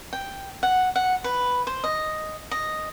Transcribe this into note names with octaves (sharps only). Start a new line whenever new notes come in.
G5
F#5
F#5
B4
C5
D#5
D#5